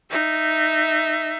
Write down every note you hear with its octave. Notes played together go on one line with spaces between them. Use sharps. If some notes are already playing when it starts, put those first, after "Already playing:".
D#4 E5